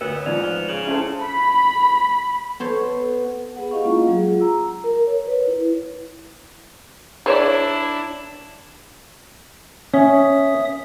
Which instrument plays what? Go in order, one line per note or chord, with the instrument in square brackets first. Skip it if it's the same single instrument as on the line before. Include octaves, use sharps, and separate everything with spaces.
[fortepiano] D2 [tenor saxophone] B3 [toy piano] A#4 C#5 [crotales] E7
[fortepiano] G#2 F3 [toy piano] D5 [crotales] F7
[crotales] F6 F7
[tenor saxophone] C#3 [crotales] F#7
[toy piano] C#4 A5 [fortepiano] E4 A4 C5
[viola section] B5
[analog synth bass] B3 [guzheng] A4 C5 C#5
[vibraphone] B3 G#4 B4 F#5
E4 G4 D#5 F5 C#6
G#3 A#3 C#4 F4
F#3 G#4
F4
A#5 E6
A#4
C#5
B4
E4
[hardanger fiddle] D4 E4 [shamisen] G#4 C#5 D5
[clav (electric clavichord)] C#4 [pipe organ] E5 D#6